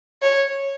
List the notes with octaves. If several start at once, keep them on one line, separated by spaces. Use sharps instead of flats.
C#5